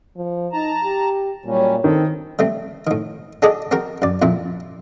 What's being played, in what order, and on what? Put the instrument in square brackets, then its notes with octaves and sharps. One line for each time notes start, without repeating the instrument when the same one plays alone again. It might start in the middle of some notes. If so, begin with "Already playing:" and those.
[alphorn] F3
[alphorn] D#4 [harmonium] A5 A#5
[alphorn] G4
[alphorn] A#2 [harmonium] F#3 G3 C#4
[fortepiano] D#3 [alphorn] C4 [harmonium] A4
[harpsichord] G3 A3 C4
A2 D#3
D4 F#4 G#4 A4 D5 D#5
C4 F#4 A#4
F#2 D5
F2 A#2 E4